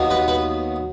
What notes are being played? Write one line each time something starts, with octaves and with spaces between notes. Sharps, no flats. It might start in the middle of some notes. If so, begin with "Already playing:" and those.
Already playing: D#2 D#3 F#3 B3
B4
B4